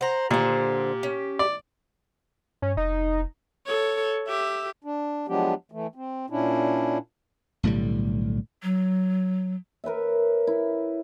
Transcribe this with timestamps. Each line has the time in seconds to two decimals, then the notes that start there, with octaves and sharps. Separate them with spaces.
0.01 C5 F#5 A#5
0.31 A#2 D3 G4 C5
1.03 C#4
1.39 D5
2.62 G2 C#4
2.77 F1 D#4
3.66 A4 C#5
4.28 G4 E5
4.84 D4
5.28 F3 F#3 G#3 B3 D4 G4
5.72 E3 A3
5.95 C4
6.30 A#2 C#4 D4 E4
7.63 B1 A2 D3 G3
8.63 F#3
9.84 A#4 B4 C#5 E5
10.47 E4